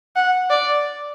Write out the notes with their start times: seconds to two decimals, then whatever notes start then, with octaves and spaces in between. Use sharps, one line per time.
0.16 F#5
0.50 D5